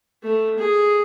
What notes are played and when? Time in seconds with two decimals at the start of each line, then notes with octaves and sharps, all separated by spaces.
0.23 A3
0.58 G#4